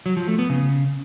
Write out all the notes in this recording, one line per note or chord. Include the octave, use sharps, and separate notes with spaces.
F#3
F3
A3
B3
C#3